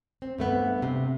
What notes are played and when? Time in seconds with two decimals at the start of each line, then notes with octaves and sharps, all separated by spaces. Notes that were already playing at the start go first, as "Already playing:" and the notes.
0.22 C4
0.38 G2 A3 B3
0.82 C3